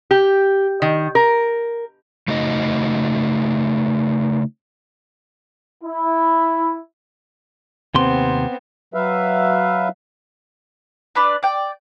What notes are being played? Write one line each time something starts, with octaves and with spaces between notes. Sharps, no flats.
G4
D#3
A#4
C#3 A3 D#4 F#4 D#5
E4
D#2 C3 B3 C4 C6
F#3 B4 E5 F5
D4 B4 D5
D5 G5